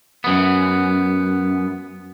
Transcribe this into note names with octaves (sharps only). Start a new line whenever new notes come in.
F#2 B3